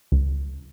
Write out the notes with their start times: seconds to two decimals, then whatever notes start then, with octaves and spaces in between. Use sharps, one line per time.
0.12 C#2